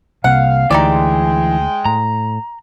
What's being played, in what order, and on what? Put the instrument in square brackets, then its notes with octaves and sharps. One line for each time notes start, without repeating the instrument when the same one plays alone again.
[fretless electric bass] C2 C3 A#3 [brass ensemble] F5 [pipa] F#5
[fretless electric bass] D2 [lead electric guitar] E3 [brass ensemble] G#3 G5 [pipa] D#4 G4 D5
[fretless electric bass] A2 [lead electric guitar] A#5